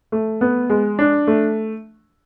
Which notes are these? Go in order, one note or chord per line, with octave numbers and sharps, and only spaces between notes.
A3
B3
G#3
D4
A3